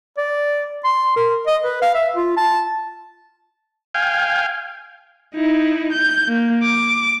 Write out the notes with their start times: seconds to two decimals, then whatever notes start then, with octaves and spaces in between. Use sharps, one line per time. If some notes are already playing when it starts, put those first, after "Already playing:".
0.18 D5
0.84 C6
1.16 A#4
1.47 D#5
1.64 B4
1.82 F5
1.95 E5
2.16 F4
2.37 A5
3.94 F5 G5 G#5
5.35 D#4 E4
5.92 G6
6.28 A#3
6.62 D6